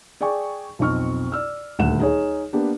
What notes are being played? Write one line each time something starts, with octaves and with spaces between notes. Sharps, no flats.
G#4 D5 G5 G#5 C#6
B1 F2 C4 C#6 F6
D5 E6 F6
D#1 D2 F#5 E7
D#4 G#4 C#5
A#3 B3 D4 G4